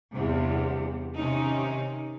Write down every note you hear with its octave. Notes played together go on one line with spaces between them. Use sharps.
E2 G2 C3
C3 D#3 C#4 D#4